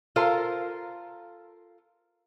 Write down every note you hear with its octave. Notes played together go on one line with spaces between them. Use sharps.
F4 A4 A#4 C5 F5